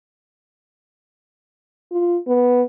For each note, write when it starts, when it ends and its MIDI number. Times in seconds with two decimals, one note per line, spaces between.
1.91 2.17 65
2.28 2.62 59